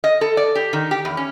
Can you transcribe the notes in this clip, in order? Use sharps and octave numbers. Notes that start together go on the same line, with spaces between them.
D#5
A4
D5
G4
D#3
G4
E2
C#4